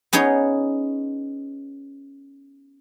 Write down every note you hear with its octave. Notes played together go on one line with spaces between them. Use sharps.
B3 C#4 D#4 G#4 C#5